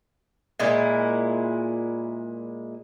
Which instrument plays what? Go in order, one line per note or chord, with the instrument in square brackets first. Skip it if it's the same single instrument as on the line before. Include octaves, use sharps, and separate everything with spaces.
[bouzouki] A#2 G#3 E4